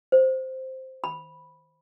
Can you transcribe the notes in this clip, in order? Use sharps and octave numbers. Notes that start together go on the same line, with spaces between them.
C5
B5